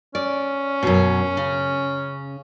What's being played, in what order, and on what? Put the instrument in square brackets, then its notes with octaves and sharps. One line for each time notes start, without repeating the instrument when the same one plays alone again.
[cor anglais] C#4 [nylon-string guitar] D5
[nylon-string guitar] F#2 B2
C#3